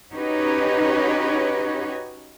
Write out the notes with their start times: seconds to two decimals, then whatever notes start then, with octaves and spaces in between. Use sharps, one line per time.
0.13 C#4 D#4 F#4 G4 B4 C#5